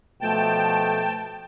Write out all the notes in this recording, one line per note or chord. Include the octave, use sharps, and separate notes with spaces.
B2 F3 A3 G5 A5